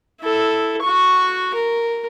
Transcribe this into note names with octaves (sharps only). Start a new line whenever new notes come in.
E4 A4
F#4 C#6
A#4